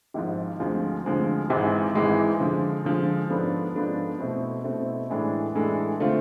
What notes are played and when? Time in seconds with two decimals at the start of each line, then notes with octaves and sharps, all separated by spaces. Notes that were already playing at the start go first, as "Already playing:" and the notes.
0.14 G#1 G#2 F3
0.59 D2 D3 F3 G#3 C4
1.05 D2 D3 F3 G#3 C4
1.50 G#1 G#2 E3 G#3 C4
1.94 G#1 G#2 E3 G#3 C4
2.40 D3 F3 G#3
2.84 D3 F3 G#3
3.30 G#2 F3 B3 D4 A4
3.75 G#2 F3 B3 D4 A4
4.20 B2 A3 C4 E4
4.64 B2 A3 C4 E4
5.10 A2 E3 G#3 D4 A4
5.55 A2 E3 G#3 D4 A4
6.00 D3 A3 C4 F4